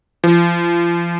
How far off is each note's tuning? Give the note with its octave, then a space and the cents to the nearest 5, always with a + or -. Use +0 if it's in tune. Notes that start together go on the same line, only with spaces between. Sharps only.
F3 -35